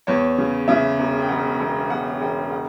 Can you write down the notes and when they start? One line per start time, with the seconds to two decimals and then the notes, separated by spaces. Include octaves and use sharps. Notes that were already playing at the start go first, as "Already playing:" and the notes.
0.07 E2 C#5
0.38 C#3
0.68 C#3 E5
0.99 E1
1.22 G5
1.29 E1 F#5
1.60 E1
1.90 E1 F#5
2.20 E1 G5
2.52 F#5